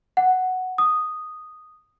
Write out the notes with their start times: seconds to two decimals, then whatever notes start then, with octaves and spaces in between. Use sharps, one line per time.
0.17 F#5
0.78 D#6